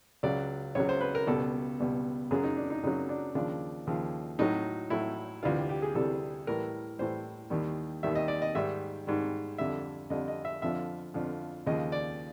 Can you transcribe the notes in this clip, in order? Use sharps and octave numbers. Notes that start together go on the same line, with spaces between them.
C#2 C#3 F#3 D5
C#2 C#3 F#3 C#5
C5
B4
A#4
C#2 B2 G3 A4
C#2 B2 G3
F#2 C#3 F#3 G#4
D#4
D4
D#4
F#2 C#3 F#3 D#4
D4
D#2 C#3 F3 D4
D#2 C#3 F3
A2 F#3 D#4
A2 F#3 E4
D2 C3 E3 G3 F4
G4
G4
G#4
D2 C3 E3 G3 A4
A2 E3 G3 A#4
A2 E3 G3 C5
D#2 D#3 G3
D#2 D#3 G3 E5
D#5
D5
D#5
G#2 D#3 G3 E5
G#2 D#3 G3
F2 D3 G3 E5
F2 D3 G3 D#5
D#5
E5
F2 D3 F3 E5
F2 D3 F3
D#2 C#3 F3 D#5
D5